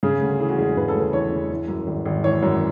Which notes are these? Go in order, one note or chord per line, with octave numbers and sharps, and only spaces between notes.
C#3 G#4
D2
E3 G#4
F#4
E1 G#4
C#3 B4
A4
D2 B4
E3 C#5
E1
E3
F#2
G#1
G#1
E3 C#5
F#2